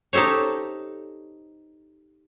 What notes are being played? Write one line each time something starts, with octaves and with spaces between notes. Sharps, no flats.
D#4 G4 A4 C5 C#5